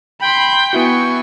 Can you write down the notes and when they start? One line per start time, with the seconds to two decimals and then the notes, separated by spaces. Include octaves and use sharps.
0.21 G5 B5 C6
0.73 B3 E4 F#4 G#5 C#6